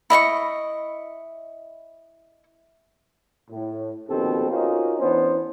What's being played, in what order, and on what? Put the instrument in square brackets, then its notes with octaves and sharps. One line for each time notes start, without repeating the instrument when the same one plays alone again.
[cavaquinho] E4 D#5 F#5 C#6
[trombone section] A2
A#1 B2 D#3 C4 G4 A4
C#4 D#4 F4 F#4 A#4 C5
E3 B3 C#4 D4 C5